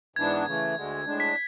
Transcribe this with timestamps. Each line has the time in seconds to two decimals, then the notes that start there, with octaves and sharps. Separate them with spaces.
0.16 G#2 E3 B3 D4 G#6
0.45 C#3 E3 A3
0.75 D2 D3 G#3
1.05 A2 G#3 D4
1.20 B6